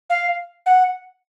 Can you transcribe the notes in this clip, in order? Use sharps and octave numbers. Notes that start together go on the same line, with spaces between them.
F5
F#5